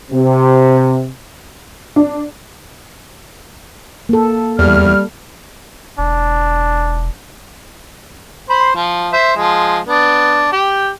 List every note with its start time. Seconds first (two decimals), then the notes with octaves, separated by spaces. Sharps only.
0.11 C3
1.96 D4
4.09 A#3 A4
4.59 E2 G3 F6
5.99 E1 D4
8.50 C5 B5 C6
8.76 F3
9.13 C5 E5
9.36 F3 G#3
9.87 B3 D4
10.52 G4 G5